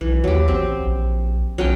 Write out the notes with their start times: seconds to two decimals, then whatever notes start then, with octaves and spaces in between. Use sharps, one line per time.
0.01 B1 E3
0.24 D#2 F#3 G4
0.48 A1 C4
0.82 A#1
1.58 B1 F#3 C#4 G5